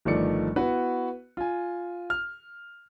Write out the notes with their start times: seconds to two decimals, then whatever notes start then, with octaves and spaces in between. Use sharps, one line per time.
0.05 G1 D#3 F3 A3 D5 C#7
0.56 B3 E4 F#4 B4
1.37 F4 G#5
2.10 F6